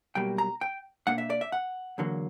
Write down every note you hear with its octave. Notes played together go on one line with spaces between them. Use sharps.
B1 B2 G3 A#3 G5
A#5
G5
B2 A#3 D4 F#5
E5
D5
E5
F#5
E2 D3 F#3 A#3